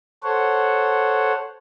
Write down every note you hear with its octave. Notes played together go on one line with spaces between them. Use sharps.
A4 C5 C#5 F#5